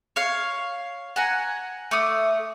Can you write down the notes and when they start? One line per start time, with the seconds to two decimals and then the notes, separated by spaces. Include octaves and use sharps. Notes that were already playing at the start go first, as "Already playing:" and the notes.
0.16 C#5 F5
1.16 F#5 G#5 A#5
1.91 A3 D6 D#6